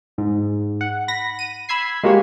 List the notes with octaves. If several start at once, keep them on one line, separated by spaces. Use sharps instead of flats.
G#2
F#5
B5 A#6
D#7
B5 E6 G#6 C7
G#3 A#3 F#4 G4 C#5